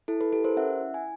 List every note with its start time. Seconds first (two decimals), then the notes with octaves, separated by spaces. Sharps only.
0.08 E4 A4
0.21 A4 B4
0.32 G4 A4 B4
0.45 A#4 C5
0.57 C#4 E5 F#5
0.81 E4
0.94 G#5